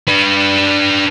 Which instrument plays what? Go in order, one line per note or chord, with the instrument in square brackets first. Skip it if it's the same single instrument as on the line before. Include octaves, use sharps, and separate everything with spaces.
[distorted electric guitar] D4 B4